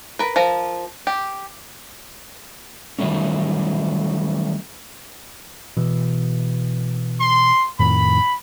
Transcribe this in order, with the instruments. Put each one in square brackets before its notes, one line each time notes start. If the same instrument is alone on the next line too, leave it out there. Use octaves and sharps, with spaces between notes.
[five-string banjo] A#4 B4
F3 A#4 A#5
G4
[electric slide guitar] D#3 E3 F#3 G3 A3 C#4
[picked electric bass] B2 E3
[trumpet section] C6
[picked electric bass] F2 A2 D#3 [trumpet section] B5